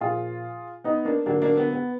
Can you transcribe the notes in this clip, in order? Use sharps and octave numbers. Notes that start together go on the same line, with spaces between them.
A#2 F3 F4 G#4
B3 D#4
A#3 D4
D3 F#3 A#3 D4
A#3 D4
B3
B3